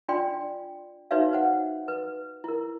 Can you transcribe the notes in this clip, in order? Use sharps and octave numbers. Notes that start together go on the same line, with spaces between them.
D4 F4 D5 G5 C6
D#4 F#4 B4 C#5 E5 F5
C5 F#5
B4
E4 A#4